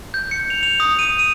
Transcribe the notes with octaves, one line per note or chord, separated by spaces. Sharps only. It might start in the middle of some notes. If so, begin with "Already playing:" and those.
G6
C#7
F7
F7
D#6
D#7
D#7